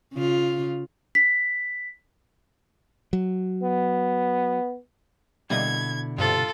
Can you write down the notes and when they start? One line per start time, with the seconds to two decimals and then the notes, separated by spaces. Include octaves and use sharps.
0.14 C#3 F4
1.15 B6
3.13 F#3
3.64 B3
5.50 B2 D3 G3 A#3 E4 D#5 G#6
6.18 G2 C3 F4 A4